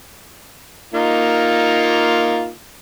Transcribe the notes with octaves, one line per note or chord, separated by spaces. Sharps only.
A#3 D#4 F4